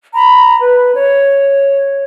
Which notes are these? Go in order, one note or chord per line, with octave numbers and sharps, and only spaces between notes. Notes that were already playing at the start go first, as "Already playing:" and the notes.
A#5 B5
B4
C#5